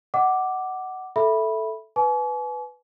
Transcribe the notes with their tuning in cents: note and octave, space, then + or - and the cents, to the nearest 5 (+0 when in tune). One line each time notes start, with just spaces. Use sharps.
D#5 +0 F#5 +15 D6 +0
A4 +0 E5 +0 B5 -10
B4 +5 G#5 +40 D6 -45